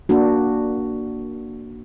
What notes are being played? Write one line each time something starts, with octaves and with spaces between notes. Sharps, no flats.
A#3 D4 F#4